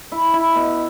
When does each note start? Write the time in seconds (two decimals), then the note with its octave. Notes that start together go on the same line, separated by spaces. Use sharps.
0.12 E4
0.33 E4
0.56 B2